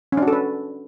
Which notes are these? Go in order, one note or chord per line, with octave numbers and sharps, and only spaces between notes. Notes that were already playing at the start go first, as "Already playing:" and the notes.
C#4
D4
F#4
A4
B4